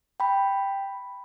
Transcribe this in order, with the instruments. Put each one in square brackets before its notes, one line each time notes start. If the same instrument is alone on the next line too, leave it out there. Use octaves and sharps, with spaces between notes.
[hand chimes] G5 B5